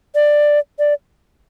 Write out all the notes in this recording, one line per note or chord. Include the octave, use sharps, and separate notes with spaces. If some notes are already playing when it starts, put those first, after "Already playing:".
D5
D5